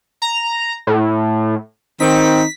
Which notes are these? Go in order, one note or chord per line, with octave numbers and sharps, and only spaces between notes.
A#5
A2
D#3 C4 D#4 B6